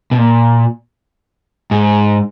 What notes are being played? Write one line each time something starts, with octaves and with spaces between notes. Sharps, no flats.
B2
A#2
G#2